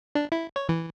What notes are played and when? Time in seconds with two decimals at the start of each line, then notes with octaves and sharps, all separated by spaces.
0.15 D4
0.32 E4
0.56 C#5
0.69 E3